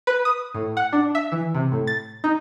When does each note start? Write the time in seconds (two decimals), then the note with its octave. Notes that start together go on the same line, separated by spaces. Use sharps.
0.07 B4
0.25 D#6
0.55 A2
0.77 F#5
0.93 D4
1.15 E5
1.32 E3
1.55 C3
1.72 A2
1.87 A6
2.24 D#4